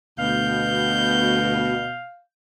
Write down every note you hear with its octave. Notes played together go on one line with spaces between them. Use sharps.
D2 B2 F5 G6